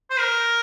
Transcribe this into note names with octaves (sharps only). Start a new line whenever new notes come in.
C5
A#4